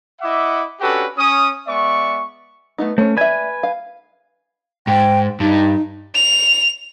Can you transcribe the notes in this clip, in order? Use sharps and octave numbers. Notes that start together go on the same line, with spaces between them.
E4 D#5 E5 F#5 D6
C#4 D4 F#4 G4 A4 B4
C#4 D#6
G#3 B3 D5 E5 C#6
A3 B3 D#4
A3 C#4 C5 C#5
B4 D5 E5 G#5
F5
G#2 G5
G2 D#4
F7